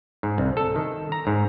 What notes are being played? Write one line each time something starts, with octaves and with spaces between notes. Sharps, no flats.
G#2
C2
A4
D#3
A#5
G#2